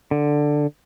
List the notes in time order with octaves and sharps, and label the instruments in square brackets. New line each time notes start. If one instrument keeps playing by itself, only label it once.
[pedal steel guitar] D3